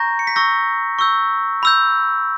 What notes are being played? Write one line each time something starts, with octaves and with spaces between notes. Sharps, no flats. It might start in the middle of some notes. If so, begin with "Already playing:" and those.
Already playing: A#5 C#6 G6 A#6
C#7
B6
C#6 E6 G6 A#6
C#6 E6 G6
B5 E6 G6